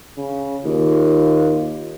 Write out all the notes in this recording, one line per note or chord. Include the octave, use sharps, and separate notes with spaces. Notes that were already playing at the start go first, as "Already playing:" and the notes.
C#3
D#2 F4